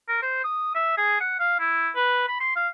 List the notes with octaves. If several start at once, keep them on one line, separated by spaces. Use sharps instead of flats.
A#4
C5
D#6
E5
G#4
F#5
F5
E4
B4
B5
C6
F5